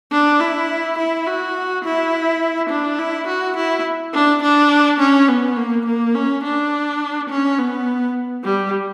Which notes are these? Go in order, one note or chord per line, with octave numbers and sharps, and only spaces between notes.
D4
E4
E4
F#4
E4
D4
E4
F#4
E4
D4
D4
C#4
B3
A#3
A#3
C#4
D4
C#4
B3
G3